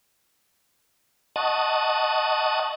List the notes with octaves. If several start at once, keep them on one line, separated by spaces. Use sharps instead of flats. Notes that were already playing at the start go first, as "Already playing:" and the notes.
D#5 F#5 A5 C#6 D#6